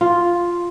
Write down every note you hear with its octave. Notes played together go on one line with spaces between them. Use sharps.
F4